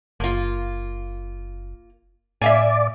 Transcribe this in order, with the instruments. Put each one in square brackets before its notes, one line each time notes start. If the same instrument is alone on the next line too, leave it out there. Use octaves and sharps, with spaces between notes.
[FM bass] F#1 [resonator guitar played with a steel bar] A#3 F4
[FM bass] A2 [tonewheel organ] D5 [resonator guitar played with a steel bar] E5 F5 G#5